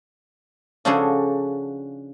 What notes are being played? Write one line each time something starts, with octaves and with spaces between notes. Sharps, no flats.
C#3 F3 D4 F#4 G#4 A4